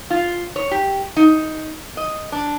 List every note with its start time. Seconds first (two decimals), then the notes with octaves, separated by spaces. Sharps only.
0.10 F4
0.56 C#5
0.71 G4
1.16 D#4
1.97 D#5
2.32 D4